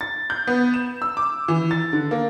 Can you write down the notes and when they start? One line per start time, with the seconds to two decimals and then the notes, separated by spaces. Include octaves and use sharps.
0.01 A6
0.30 G6
0.47 B3
0.74 E7
1.02 E6
1.17 D6
1.48 E3
1.71 A6
1.93 D3
2.11 A#3